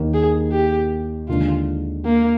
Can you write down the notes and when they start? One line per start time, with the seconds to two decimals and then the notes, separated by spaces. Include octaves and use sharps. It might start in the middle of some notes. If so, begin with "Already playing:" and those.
Already playing: D#2 D#3 A#3
0.14 G#4
0.52 G4
1.28 D#2 D3 G#3 D4 F4
2.05 A#3